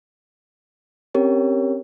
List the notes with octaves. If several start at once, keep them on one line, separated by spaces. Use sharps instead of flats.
C4 C#4 G4 A#4 C#5